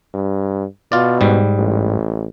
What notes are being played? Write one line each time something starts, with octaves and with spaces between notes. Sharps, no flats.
G2
B2 F4 D5
G#2 G3
A1